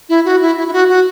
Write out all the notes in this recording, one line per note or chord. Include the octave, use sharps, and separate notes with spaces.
E4
F#4
E4
E4
E4
F#4
F#4